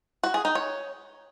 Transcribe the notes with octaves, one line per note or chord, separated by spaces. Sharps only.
F#4
G#4
D#4
C#5